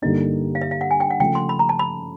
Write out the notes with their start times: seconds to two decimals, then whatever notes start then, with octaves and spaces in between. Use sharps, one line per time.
0.02 G2 D3 G3 A#3 D#4 D#5
0.55 F5
0.61 E5
0.71 F5
0.81 F#5
0.91 G#5
1.00 G5
1.10 F#5
1.20 C#3 F3 A3 G5
1.35 C6
1.49 B5
1.59 A#5
1.69 A5
1.79 B5